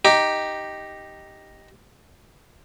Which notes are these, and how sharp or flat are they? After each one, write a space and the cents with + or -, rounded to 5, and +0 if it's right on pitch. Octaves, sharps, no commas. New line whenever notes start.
D#4 +0 G4 +0